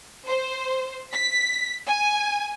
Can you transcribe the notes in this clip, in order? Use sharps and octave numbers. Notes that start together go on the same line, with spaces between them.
C5
B6
G#5